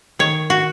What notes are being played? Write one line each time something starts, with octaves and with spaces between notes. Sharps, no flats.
D#3 C#5
F#4